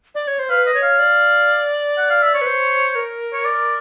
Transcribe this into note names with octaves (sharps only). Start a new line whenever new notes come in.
D5
C#5
C5
B4 F5
D#5
C#5
F5
D5
F#5
F5
E5
C#5
B4
C5
A#4
C#5
D5